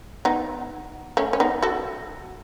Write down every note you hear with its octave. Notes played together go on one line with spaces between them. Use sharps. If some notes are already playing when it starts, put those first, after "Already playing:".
B3 D#4
A3 C#4
C#4
B3 D#4
F#4 A4